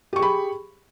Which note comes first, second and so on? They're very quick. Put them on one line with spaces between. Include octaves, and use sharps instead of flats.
G4 C#6 G#4 B5